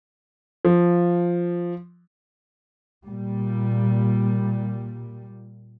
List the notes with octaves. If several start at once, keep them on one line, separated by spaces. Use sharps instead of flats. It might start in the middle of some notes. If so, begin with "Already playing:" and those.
F3
A#2 G3